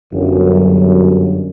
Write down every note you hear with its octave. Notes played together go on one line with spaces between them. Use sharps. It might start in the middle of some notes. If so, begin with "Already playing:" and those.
G1 F#2